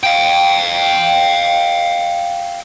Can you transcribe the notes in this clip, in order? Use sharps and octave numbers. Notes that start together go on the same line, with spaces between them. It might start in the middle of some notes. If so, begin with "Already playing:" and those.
F5 G5